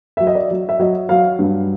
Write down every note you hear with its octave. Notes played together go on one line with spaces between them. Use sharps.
F#3 E5
D#5
D5
F#3
E5
F#3 D#5
F#3 F5
G2